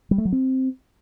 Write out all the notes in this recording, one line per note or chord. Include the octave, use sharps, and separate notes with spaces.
G3
A3
F#3
C4